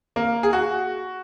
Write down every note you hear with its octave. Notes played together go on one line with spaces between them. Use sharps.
A#3
G#4
F#4